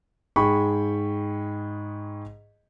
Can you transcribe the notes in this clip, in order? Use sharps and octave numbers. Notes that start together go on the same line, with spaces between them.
G#2 G#4 G5 B5 C#6